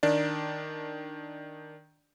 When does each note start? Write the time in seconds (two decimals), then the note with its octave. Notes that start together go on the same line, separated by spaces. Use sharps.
0.03 D#3 D4 D5